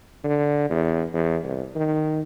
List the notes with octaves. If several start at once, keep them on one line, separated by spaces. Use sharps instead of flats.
D3
E2
E2
C2
D#3